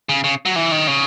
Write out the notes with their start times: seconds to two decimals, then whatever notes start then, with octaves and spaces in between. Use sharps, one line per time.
0.09 C#3
0.24 C#3
0.46 F#3
0.56 E3
0.72 D#3
0.87 C#3